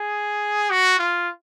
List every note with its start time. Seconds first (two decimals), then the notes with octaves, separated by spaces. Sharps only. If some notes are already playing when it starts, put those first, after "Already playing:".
Already playing: G#4
0.71 F#4
0.99 F4